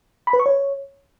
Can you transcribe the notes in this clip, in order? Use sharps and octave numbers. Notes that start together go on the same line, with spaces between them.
B5
B4
C#6
C#5